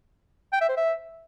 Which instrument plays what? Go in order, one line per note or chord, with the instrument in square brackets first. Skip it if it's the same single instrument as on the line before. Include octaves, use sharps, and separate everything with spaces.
[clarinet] G5
E5
C5
E5